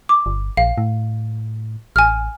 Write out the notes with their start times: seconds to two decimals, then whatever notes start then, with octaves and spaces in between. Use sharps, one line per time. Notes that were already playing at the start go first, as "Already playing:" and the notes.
0.09 D6
0.26 G1
0.57 A#1 F5
0.78 A2
1.96 A1 G#5 F6